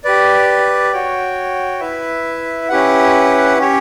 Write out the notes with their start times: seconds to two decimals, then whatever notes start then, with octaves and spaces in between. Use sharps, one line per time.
0.04 G4 B4 D5
0.93 F#4 C#5 G5
1.80 E4 B4 E5
2.69 C#4 E4 G4 B4 F#5
3.58 C#4 G4 C#5